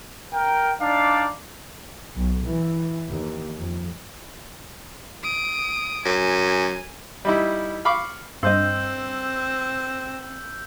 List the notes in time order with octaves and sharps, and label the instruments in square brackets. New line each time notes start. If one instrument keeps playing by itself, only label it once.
[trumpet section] A#4 G5
D4 D#4 D5 F5
[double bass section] B1
E3
D#2
F2
[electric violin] D#6 D7
[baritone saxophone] F#2 [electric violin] G#5
[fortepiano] G3 D#4 E4
F5 B5 C#6 D6
[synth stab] G2 [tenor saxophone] C4 [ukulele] C5 D#5 [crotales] E6 G6